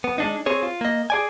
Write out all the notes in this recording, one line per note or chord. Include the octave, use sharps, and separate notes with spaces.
B3
G#3 D4 D#4
C4 G#4 C#5
F4
A#3 D#5
G#4 D5 G#5